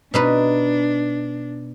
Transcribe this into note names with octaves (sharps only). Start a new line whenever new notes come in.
B2 D4 D#4 B4